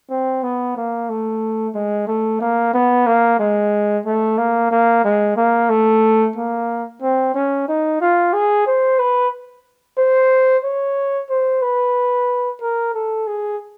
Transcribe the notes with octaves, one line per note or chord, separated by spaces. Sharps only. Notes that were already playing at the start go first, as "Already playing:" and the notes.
C4
B3
A#3
A3
G#3
A3
A#3
B3
A#3
G#3
A3
A#3
A#3
G#3
A#3
A3
A#3
C4
C#4
D#4
F4
G#4
C5
B4
C5
C#5
C5
B4
A#4
A4
G#4